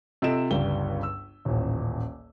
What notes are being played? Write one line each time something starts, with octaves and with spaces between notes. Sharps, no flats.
C3 F4 A4 D#5 D7 E7
G1 C#2 G3 G7
E6
D#1 A1